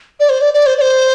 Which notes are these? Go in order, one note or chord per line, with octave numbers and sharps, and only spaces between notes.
D5
C5
D5
D5
C5
D5
C5